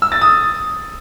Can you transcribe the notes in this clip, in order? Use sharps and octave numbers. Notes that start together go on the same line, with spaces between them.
E6
A6
D#6